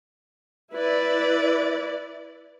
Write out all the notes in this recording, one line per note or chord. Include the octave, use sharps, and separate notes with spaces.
E4 B4 D5